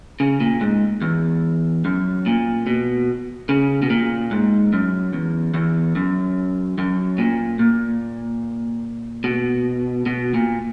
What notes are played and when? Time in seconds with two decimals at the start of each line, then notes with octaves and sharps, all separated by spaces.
0.20 C#3
0.40 A#2
0.61 G#2
1.02 E2
1.85 F#2
2.26 A#2
2.67 B2
3.49 C#3
3.82 B2
3.90 A#2
4.31 G#2
4.73 F#2
5.13 E2
5.54 E2
5.95 F#2
6.78 F#2
7.18 A#2
7.59 A#2
9.24 B2
10.06 B2
10.34 A#2